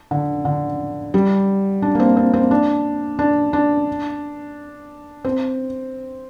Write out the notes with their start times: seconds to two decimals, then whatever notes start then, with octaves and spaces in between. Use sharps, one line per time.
0.11 D3
0.45 D3
1.14 G3
1.82 D4
1.95 A#3
2.00 C4
2.17 C4
2.34 C4
2.51 D4
3.19 D4
3.53 D4
5.25 C4